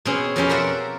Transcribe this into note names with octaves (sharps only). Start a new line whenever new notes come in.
B2 C4 C#4 G#4
F2 B2 A#3 C#4 G4 C6
A#4 C5 D5 E5 F#5